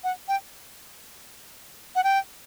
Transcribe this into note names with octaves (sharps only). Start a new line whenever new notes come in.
F#5
G5
F#5
G5